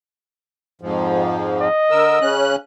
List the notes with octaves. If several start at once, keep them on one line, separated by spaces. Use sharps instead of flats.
F2 G#2 F3
D#5
D3 A#4 E6
C#3 C#4 F#6